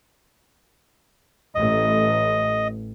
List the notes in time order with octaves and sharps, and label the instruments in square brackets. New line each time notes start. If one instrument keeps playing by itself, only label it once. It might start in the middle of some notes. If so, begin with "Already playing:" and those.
[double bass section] A1 A3 [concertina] D#5